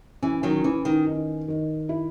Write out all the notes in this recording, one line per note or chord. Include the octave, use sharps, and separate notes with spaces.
E3 C#4
D#3 F#3
E3 C#4
D#3
D#3
D#3
E4